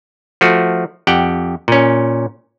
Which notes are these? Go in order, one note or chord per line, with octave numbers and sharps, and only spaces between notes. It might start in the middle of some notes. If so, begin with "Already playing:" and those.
F3 A3 F#4
F2 G4 F#5 G5
A#2 C#4